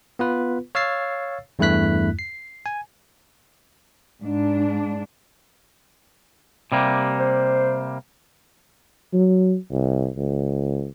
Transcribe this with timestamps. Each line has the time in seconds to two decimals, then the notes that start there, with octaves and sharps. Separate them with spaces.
0.19 B3 F4 B4
0.75 C#5 F5 E6 A6 C7
1.59 E2 G2 A3 E4 F#6 B6
2.19 C7
2.66 G#5
4.22 G#2 D4
6.72 C3 G3 A#3
7.20 C5
9.13 F#3
9.71 C2
10.17 C#2